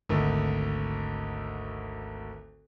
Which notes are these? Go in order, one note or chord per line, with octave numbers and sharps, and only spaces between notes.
G#1 D2